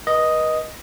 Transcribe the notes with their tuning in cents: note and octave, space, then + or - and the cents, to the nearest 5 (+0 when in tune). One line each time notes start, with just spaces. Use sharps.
B4 -35 D#5 +0